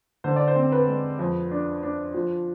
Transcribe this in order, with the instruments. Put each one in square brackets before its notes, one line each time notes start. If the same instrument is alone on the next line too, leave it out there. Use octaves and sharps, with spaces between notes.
[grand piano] D3 C5
D5
C5
C4
B4
G#3
F2
D4
D4
F3